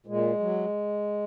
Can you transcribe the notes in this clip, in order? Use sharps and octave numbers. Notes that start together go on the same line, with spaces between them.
A#2 G#3
F#3